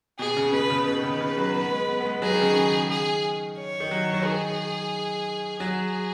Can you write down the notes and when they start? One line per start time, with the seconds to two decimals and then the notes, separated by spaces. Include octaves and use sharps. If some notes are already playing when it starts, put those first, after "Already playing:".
0.19 B2 G#4
0.37 C#3
0.53 B2 B4
0.70 C#3
0.87 B2 B4
0.97 D#3
1.04 C#3
1.20 C#3
1.38 F#3
1.54 B3
1.71 G#3
1.88 B3
2.01 B3
2.05 G#3
2.22 F#3 G#4
2.32 D#3
2.42 C#3
2.52 D#3
2.89 G#4
3.58 C#5
3.80 D#3
3.91 F#3
4.14 F#3
4.25 D#3 G#4
5.60 F#3 G#4